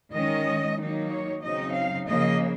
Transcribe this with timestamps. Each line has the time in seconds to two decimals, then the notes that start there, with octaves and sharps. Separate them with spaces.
0.13 D#3 G#3 C#4 D#5
0.77 D#3 F#3 A#3 D#4
1.10 C#5
1.42 C#3 F#3 C4 D#4 D#5
1.75 F5
2.08 C#3 F3 A#3 D#5